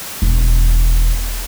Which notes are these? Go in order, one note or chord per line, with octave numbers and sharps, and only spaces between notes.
E1